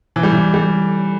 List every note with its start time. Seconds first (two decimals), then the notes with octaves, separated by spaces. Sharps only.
0.16 E3
0.23 G3
0.33 E3
0.54 G3